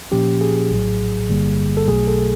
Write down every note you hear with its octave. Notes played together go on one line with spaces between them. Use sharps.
A#2 F3 A#3 C#4 G4
G#4
A#1 A2 F#3
G1 G2 D3 G3 A#3
A4
B1 B2 F#3 A3 G#4
A4